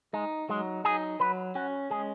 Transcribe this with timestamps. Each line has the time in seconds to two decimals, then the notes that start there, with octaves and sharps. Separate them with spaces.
0.13 G#3 D#4
0.49 F#3 G#3
0.85 D#4 G#4
1.20 F#3 B4
1.55 C#4 F#4
1.90 G#3 G#4